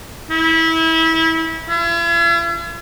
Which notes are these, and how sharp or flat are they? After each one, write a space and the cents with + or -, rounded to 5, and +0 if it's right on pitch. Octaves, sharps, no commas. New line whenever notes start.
E4 -25
E4 +45